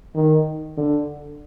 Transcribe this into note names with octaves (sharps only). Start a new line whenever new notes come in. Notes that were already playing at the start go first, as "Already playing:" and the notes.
D#3
D3